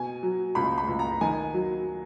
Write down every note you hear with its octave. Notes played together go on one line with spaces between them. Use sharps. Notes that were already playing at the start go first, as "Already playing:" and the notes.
Already playing: B2 G#5
F#3
C#2 B5
B5
C#2
A#5
D#3 G#5
F#3